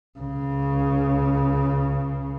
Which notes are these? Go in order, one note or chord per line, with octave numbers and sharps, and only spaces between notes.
C#2 C#3